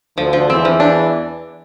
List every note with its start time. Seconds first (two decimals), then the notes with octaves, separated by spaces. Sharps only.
0.17 D2 D3 F3
0.33 F3
0.49 E2 E3 C4
0.65 F3
0.80 D4